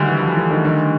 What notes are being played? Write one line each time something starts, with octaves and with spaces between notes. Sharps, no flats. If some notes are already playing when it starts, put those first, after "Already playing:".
Already playing: D2 D3 D#3 G3
E3
F3
E3
D#3
D#3